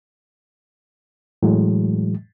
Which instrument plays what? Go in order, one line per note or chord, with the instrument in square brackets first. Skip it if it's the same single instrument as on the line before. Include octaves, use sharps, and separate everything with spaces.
[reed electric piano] A2 E3 F#3 G#3